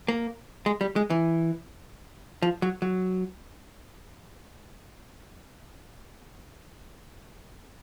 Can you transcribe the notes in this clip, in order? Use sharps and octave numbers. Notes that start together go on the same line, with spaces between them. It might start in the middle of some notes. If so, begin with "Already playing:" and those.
A#3
G#3
G3
G#3
E3
F3
F#3
F#3